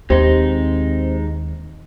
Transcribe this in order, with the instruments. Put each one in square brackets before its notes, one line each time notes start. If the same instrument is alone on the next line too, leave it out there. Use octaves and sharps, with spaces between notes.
[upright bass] D#2 [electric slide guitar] G#3 D#4 [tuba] C4 [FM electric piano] G4 C5